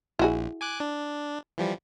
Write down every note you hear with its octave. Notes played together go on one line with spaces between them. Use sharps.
A#1 E4 F#4 G#4
G#5 D6 F#6
D4
E3 F3 G3